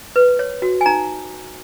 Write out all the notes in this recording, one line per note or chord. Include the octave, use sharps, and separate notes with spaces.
B4
C#5
F#4
G#5
D#4 A#5